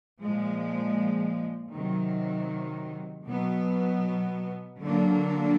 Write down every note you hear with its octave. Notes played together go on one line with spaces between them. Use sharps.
A#2 F3 G#3
C3 D#3 F#3
B2 F#3 B3
D3 F#3 A#3 D4